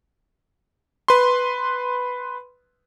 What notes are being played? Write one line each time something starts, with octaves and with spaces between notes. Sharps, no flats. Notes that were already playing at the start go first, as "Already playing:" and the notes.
B4 C6